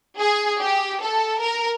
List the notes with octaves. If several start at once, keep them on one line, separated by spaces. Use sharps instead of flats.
G#4
G4
A4
A#4